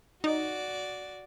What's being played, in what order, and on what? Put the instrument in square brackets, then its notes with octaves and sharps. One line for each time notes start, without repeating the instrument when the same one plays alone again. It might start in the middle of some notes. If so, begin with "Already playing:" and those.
[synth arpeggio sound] D#4 [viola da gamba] F#4 D5